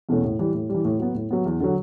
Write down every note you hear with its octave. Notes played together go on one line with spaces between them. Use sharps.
E2 B2 A3 C#4
A2
E3 G3
A2
E3 G3
A2
F#3 B3
A2
F#3 B3
E2
D3 F#3